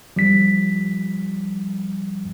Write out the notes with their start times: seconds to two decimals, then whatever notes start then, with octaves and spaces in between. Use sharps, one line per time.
0.16 F3 G3 B6